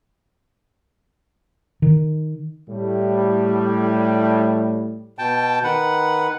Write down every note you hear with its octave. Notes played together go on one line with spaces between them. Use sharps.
D#3
A2 G3
B2 G5 A5
D#3 B4 F#5